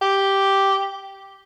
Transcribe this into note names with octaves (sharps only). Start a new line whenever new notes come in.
G4